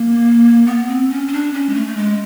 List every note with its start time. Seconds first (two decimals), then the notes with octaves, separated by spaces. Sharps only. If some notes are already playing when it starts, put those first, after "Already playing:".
Already playing: A#3
0.67 B3
0.88 C4
1.10 C#4
1.28 C#4
1.32 D4
1.54 C#4
1.69 G#3
1.75 A3
1.87 A3
1.97 G#3